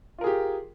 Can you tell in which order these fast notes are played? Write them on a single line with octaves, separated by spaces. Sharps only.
F4 A#4 G#4 G4